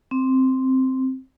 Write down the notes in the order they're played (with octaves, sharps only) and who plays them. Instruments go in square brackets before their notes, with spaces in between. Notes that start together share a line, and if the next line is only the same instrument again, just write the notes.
[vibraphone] C4